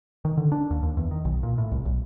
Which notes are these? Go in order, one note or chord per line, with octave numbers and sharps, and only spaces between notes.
D#3
D3
D4
D#2
D#2
E2
D#3
B1
A#2
A2
C2
B1